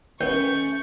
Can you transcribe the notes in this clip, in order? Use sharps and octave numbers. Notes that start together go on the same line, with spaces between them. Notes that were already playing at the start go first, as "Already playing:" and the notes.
D#2 A3 B3 C#4 C#6 G6